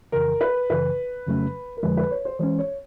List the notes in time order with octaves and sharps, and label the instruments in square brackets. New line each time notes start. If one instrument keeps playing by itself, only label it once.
[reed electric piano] F2 C#3 E3 [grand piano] A#4
[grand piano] B4
[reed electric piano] F#2 C#3 E3 [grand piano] B4
[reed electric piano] F2 C#3 F#3 A3 C#4
[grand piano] A#4
[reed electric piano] F2 D3 F3 G#3 [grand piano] B4
[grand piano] B4
C#5
C5
[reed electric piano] E3 G#3 C#4 [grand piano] C5
[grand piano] C#5